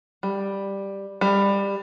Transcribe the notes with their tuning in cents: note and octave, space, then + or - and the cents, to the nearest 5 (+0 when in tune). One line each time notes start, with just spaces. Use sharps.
G3 +5
G3 +20